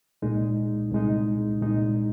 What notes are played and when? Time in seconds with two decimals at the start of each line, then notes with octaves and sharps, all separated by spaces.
0.22 C2 A#2 G#3 D#4
0.92 C2 A#2 G#3 D#4
1.61 C2 A#2 G#3 D#4